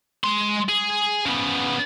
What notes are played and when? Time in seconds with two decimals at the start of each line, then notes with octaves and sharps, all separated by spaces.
0.24 G#3 C6
0.69 G#4
1.26 C#3 B3